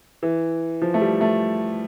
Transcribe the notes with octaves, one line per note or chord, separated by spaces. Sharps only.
E3
F3
A3
G3
A3